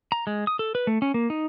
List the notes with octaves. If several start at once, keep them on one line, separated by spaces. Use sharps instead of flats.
A#5
G#3
D#6
A4
B4
A3
C#4
A#3
D#4